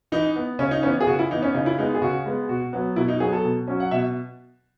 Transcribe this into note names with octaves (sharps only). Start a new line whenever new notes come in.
E3 D#4
B3
C#3 C#4
D#4
E3 B3 C#4
G#4
C#3 F#4
E4
E3 B3 D#4
C#4
C#3 D#4
E4
G#3 B3 D#4
G#4
C#3 F#4
G#3 B3
B2 F#4
F#3 B3
B2 E4
D#4
F#3 B3 G#4
A4
B2
F#3 C#4
F#5
B2 E5